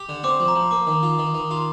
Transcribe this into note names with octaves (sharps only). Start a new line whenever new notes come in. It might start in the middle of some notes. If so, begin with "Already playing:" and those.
Already playing: G4
D3
C4 D6
F3
A#5
F3
A#3 D6
D#3
F4
D#3
D#3
F4